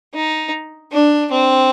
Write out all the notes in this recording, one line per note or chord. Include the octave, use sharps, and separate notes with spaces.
D#4
D4
C4